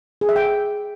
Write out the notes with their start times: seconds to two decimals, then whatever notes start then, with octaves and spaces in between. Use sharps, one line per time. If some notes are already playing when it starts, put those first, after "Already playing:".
0.21 G#4
0.29 E5
0.36 G5